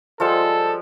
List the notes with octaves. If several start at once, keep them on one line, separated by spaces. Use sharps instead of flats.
F3 G3 G#3 A4